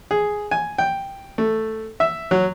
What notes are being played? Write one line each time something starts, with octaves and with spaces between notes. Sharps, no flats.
G#4
G#5
G5
A3
E5
F#3